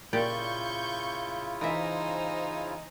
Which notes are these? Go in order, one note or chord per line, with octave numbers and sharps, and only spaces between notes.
A#2 C#3 E4 F4 G4 D5 C#6 G6
E3 D#4 C5 E5 G#5 A#5